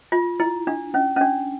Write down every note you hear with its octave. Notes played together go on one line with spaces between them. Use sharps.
F4
E4
D4
C#4
C#4
D4